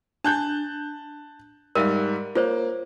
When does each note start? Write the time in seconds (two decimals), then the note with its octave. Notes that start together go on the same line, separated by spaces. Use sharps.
0.24 D4 A5 F#6 G6
1.75 G#2 G3 A#4 E5 F5
2.35 A#3 F4 C5 C#5